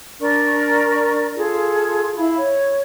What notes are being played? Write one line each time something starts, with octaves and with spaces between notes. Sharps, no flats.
D4 A#4 D5 C#6
F4 G#4 A4
E4 F5 B5
C#5